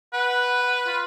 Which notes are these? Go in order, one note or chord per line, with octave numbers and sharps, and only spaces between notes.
B4 F#5
F#5
F4